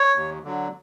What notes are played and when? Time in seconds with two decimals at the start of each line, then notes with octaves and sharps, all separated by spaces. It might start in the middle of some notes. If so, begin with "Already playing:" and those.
Already playing: C#5
0.15 D#2
0.44 D3 F#3